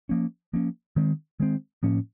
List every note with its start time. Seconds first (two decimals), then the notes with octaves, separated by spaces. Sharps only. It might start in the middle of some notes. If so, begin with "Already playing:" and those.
0.09 F3 A#3 C#4
0.53 F3 A#3 C#4
0.96 D#3 G#3 C4
1.40 D#3 G#3 C4
1.83 A2 F3 A#3 C#4